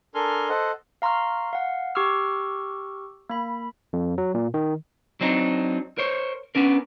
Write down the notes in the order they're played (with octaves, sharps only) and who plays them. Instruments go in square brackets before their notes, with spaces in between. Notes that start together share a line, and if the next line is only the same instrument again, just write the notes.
[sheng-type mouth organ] D4 A4 A#4 G#5 C6 F6
A4 C5 D#5 F#5
[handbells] F5 A#5 C6 C#6 F6
F5 F#5
G4 C#6 D6 E6 F6
A#3 B5
[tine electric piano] F2
F#3
A#2
D#3
[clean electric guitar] F#3 C4 D4 D#4
A#4 C5 C#5
B3 C#4 D4 A#4